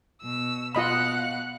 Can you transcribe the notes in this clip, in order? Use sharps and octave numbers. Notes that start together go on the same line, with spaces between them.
B2 E6
B2 F4 D#5 F5 F#5 B5 F#6